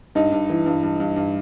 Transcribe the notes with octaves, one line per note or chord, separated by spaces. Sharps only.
G2 D#4
G2
E3
G2
G2
G2
G2